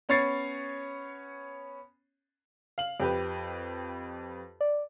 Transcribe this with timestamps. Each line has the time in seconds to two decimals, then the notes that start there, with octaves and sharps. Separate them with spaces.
0.09 B3 C#4 C#5 C#6 A6 C7
2.78 F5 F#7
3.00 F2 G4 B4
4.61 D5